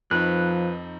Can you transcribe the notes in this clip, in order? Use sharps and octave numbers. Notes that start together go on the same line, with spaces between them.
F2 F3 D#4 B4 F#6